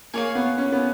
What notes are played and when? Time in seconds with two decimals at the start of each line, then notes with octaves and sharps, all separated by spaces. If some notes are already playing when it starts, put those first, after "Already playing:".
0.14 A#3 G#4 C#5 F5
0.35 B3
0.58 C#4
0.72 B3